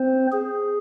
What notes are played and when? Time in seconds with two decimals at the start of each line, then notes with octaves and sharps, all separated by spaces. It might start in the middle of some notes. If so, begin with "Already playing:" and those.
Already playing: C4 C5
0.32 G#4